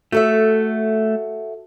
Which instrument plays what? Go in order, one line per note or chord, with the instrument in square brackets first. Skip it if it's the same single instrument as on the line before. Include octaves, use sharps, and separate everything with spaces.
[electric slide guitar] A3 [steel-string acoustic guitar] F#4 A4 E5